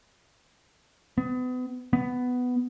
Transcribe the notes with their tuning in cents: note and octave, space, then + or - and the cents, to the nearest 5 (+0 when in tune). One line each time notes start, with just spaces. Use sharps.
B3 +35
B3 +10